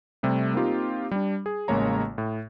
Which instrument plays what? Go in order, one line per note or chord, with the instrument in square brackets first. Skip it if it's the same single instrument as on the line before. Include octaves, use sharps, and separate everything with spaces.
[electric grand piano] C3 G3 A3
A#3 C4 D#4 F4 G4
G3 D4
G#4
A1 C#3 G#3 A#3 C#5 A#5
A2